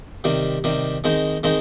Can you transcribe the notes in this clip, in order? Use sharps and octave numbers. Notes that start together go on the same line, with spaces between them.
C3 D#3 G3
C3 D#3 G3
D#3 G#3 C4 D#4
D#3 G#3 C4 D#4